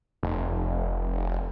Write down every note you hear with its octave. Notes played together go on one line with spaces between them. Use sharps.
F1